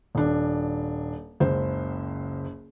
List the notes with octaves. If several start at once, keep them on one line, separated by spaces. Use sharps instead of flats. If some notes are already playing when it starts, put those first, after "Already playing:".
D#1 D4
F#1 C#2 C5